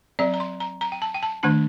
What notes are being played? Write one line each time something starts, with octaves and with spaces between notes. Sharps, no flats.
F#3 C4 D5
A#5
C6
A#5
A#5
G5
A5
G5
A5
D#3 A3 D4 A5